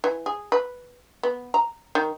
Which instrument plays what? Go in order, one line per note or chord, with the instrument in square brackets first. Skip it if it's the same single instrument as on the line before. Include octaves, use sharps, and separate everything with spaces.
[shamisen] E3
G#4
B4
B3
A#5
D#3